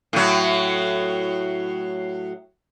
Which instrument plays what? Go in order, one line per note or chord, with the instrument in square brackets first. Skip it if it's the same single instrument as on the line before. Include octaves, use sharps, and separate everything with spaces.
[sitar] A2 F#3